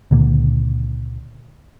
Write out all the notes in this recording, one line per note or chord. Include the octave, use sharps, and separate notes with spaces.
C#2 A#2 D3 A#3